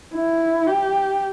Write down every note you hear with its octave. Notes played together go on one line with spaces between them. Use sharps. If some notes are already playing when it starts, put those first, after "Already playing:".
E4
G4